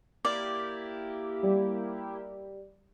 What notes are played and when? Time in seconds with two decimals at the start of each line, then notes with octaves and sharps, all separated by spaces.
0.25 A#3 E4 G4 D5
1.43 G3